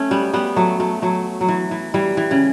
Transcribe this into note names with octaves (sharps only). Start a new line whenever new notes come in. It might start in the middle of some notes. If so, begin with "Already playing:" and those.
Already playing: A3 C#4
G3 B3
G3 B3
F#3 A3
F#3 A3
F#3 A3
F#3
E3
E3
E3 G3
E3
C#3